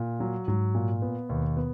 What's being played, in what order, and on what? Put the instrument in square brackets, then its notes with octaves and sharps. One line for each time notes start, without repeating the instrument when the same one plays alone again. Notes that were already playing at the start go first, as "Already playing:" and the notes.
Already playing: [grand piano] A#2
F#3
[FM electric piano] G#2 [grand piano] F#3
[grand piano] A#2
B3
[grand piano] D#2 [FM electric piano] B2
[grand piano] B3